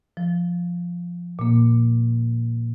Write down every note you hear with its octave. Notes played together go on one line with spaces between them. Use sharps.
F3
A#2 A#3